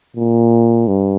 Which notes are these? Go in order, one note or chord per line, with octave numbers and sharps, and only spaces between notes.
A#2
G2